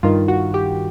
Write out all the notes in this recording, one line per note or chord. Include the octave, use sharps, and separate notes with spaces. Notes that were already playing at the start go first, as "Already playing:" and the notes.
G2 D#3 F4
F#4
G4